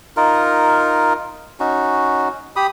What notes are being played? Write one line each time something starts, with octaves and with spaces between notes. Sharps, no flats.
D#4 F4 A#4
C#4 D#4 F#4
G4 B5 D#6